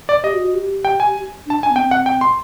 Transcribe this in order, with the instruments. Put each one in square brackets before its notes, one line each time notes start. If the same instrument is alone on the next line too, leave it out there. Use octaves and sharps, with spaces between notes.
[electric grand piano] D5
[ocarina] G4 [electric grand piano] D#5
[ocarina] F#4
F#4
G4
[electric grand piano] G5
G#5
[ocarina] D4 [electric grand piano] A5
[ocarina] D4 [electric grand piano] G#5
[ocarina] B3
[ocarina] C4 [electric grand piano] G5
[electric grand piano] F#5
G5
C6